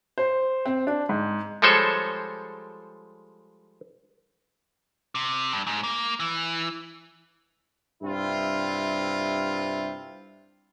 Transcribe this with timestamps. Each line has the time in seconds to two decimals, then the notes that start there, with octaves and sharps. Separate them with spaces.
0.18 C5
0.66 C4
0.87 D4
1.09 G#2
1.62 F3 G3 G#3 A4 C5 C#5
5.15 C3
5.53 G2
5.67 G#2
5.84 A#3
6.20 E3
8.01 G2 C3 E4 F4